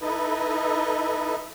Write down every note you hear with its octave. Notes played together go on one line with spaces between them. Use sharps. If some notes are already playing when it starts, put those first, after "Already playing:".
D#4 E4 A4 B4 D#5